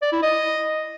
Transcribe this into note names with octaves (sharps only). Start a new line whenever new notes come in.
D5
E4
D#5